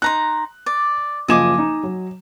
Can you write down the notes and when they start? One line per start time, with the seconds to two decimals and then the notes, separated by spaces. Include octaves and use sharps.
0.02 D#4 A#5 C6 F#6
0.66 D5
1.28 F#1 F3 D#5 G#5 D6 E7
1.58 D#4
1.83 F#3